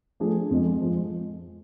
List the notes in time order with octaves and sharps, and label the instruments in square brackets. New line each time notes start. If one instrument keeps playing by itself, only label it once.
[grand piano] F3 A3 D4 G#4
F2 F3 G#3
F3 G#3